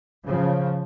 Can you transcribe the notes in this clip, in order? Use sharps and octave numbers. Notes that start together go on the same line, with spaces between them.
C#3 F3